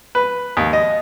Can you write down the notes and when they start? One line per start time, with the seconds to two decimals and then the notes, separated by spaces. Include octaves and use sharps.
0.15 B4
0.57 D#2
0.73 D#5